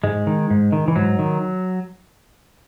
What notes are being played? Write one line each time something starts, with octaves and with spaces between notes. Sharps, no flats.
G#2 G#3
D#3
G#2
D#3
E3
G#2 F#3
D#3